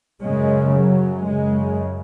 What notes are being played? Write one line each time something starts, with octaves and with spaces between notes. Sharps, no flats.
F#2 C#3 G#3
F#3
F#2 C#3 G#3